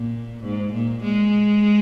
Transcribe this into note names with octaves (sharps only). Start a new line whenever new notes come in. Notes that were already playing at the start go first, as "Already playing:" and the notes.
Already playing: A#2
G#2
A#2
G#3